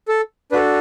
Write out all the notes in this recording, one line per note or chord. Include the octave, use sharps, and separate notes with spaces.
A4
D4 F#4 A4 B4